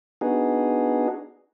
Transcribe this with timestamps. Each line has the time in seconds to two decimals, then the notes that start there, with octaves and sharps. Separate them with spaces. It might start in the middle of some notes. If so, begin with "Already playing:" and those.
0.21 B3 D4 D#4 F#4 G#4